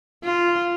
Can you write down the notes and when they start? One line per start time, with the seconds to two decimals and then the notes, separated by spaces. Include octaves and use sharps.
0.24 F4